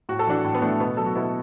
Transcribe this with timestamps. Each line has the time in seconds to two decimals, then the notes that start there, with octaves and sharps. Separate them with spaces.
0.09 A2 F#4
0.19 A4
0.27 E3 D4 F#4
0.44 A2
0.54 B3
0.62 E3 A3 D4
0.80 B2 B3
0.97 F#3 A4
1.06 F#4
1.15 B2 B3 E4